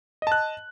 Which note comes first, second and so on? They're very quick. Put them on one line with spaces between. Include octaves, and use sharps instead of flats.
D#5 A5 F#6